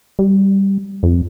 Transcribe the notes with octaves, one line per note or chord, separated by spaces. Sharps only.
G3
F2